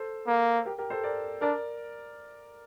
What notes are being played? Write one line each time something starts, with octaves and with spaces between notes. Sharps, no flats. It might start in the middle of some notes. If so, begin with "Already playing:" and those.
Already playing: A4 C5
A#3
G4 A#4
G4 A#4
A4 C5
A#4 D5
D4 A#4 D5